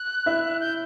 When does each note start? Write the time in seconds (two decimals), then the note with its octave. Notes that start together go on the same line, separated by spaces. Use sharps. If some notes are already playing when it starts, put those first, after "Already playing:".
Already playing: F#6
0.26 E4 E5
0.60 G6